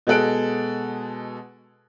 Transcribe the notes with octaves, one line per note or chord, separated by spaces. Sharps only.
B2 G#3 G#4 A4 F#6 D7